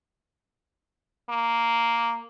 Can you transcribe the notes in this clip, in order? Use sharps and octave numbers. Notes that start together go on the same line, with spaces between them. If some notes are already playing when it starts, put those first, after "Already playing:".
A#3